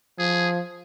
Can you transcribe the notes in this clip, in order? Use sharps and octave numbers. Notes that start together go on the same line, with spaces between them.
F3 G#4